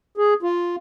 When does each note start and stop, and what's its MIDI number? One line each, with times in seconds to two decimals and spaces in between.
0.17 0.34 68
0.43 0.76 65